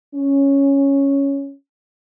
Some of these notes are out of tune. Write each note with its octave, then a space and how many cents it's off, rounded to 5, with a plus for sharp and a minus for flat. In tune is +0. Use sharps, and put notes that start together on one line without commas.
C#4 +0